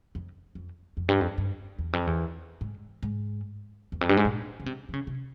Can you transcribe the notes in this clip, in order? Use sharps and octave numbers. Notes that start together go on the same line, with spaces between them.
F2
F2
F2
G2
F2
G2
E2
F2
E2
G#2
G#2
E2
F2
G2
G#2
A#2
C#3
C3
E3
C#3
C3